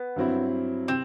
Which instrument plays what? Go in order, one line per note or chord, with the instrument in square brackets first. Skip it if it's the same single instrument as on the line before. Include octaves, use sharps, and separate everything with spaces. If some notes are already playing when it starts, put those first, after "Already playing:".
Already playing: [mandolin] B3
[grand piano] G2 F#3 C4 E4
[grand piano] C3 [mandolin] C4